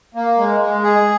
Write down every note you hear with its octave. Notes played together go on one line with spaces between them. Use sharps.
A#3
G#3
G#3
G#4